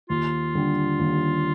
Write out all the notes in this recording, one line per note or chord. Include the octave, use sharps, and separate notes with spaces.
D#2 F4
D3 G3
D#2